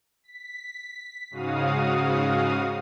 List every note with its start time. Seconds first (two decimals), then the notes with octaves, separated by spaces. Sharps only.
0.24 B6
1.31 G#2 C#3 F#4 F5 D#6